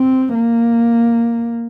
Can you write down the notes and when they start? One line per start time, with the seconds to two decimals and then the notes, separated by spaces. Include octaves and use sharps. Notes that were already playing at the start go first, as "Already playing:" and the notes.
Already playing: C4
0.34 A#3